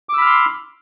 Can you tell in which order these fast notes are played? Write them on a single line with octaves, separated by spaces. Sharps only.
D6 E6 B5 F6 C6